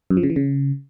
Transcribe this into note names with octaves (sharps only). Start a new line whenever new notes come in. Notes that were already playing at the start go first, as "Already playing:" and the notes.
F#2
F3
C#3
E3
C#3